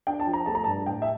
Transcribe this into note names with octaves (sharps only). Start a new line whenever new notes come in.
D4 G5
A5
F3
A#5
A3 A5
A#5
G2 A5
A2 G5
E5